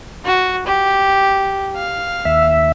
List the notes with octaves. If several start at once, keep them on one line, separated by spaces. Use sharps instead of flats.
F#4
G4
F5
D#2 E5